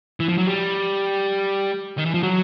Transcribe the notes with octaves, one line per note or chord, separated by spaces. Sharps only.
E3
F3
F#3
G3
D#3
E3
F3
F#3